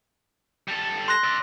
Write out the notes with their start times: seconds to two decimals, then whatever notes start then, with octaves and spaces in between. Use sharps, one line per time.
0.68 G3 A4
1.08 C6 F#6 A#6
1.24 D5 E5